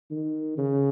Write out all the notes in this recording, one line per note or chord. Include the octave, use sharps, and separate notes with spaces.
D#3
C#3